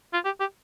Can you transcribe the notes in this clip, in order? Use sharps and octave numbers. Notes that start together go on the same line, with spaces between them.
F4
G4
G4